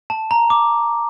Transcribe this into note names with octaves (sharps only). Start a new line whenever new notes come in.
A5
A#5
D6